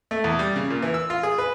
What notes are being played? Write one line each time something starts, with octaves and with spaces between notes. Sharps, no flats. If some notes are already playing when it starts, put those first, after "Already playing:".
A3
E2
G3
C#3
A#2
E3
E6
F4
G#4
B4